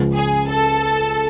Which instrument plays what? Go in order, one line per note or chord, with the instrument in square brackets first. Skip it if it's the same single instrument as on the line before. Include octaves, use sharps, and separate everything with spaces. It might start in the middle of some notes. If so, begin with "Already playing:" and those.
Already playing: [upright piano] C#2 C#3 F3 G#3
[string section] G#4
A4